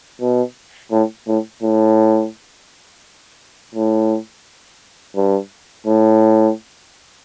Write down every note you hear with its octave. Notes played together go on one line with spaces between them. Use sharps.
B2
A2
A2
A2
A2
G2
A2